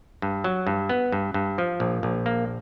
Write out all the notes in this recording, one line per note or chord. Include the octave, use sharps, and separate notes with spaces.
G2
F#3
G2
B3
G2
G2
F3
A#1
A#1
A#3